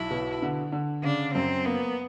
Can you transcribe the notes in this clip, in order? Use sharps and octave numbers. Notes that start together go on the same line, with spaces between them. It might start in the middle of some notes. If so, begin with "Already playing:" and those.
Already playing: B1 E4
B2
D3
D3
C#3 D4
F#2 C4
A#3 B3